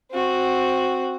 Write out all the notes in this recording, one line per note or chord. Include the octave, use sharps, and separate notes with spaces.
C4 F#4